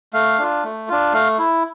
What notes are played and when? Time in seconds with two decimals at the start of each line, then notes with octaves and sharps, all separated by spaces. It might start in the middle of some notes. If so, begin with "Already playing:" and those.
0.13 A3 F5
0.39 D4 F4
0.64 A3
0.88 D4 F4
1.13 A3 F5
1.38 E4